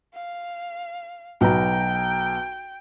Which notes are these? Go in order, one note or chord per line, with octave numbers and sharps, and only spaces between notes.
F5
B1 B4 G5 A#5